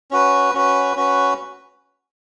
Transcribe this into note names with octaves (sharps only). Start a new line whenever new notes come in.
C#4 F#4 B4
C#4 F#4 B4
C#4 F#4 B4